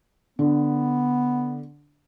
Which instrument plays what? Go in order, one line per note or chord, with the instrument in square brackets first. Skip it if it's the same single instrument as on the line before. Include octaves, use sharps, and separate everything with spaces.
[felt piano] D3 [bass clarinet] B3